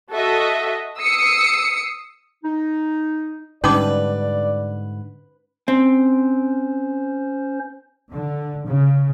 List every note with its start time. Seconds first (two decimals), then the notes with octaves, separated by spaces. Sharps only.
0.12 F#4 A4 D#5 E5
0.99 D#6 E6 C7 C#7
2.44 D#4
3.64 G#2 D3 G3 C#4 D#4 B4 D5 D6
5.68 C4 C#4 C5
8.11 D3
8.66 C#3